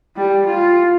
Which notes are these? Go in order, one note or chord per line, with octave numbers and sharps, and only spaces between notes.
G3
F4